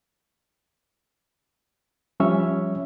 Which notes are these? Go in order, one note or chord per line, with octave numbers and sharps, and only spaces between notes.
F3 G3 C#4 C#5 E5